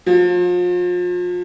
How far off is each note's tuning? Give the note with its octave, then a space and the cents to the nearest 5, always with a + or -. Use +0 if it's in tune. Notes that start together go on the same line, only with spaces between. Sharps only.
F3 +35